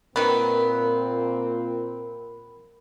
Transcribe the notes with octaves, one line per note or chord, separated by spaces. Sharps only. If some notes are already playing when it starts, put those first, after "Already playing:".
A#2 D#3 B3 C4 A#4 B5